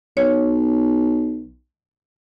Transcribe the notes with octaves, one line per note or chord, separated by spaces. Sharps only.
B1 C#5